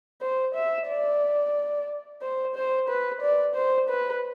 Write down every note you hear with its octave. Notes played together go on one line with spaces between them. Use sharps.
C5
E5
D5
C5
C5
B4
D5
C5
B4